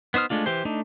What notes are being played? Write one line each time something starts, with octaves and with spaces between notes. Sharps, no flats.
B3 D#4 C5 D#6 F6
G#3 A3 D4 F4
E3 G4 C5
A3 D4 D#4